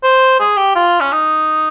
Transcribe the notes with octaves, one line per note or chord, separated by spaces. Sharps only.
C5
G#4
G4
F4
C#4
D#4